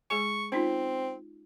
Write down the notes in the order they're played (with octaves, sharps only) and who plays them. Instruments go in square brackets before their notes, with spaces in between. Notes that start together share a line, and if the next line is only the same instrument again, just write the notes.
[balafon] G#3 G#4 G#5 [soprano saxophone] C#6
[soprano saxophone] C4 [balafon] C#4 D#4 F4